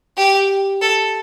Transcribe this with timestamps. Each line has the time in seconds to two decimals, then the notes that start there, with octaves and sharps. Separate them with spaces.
0.18 G4
0.82 A4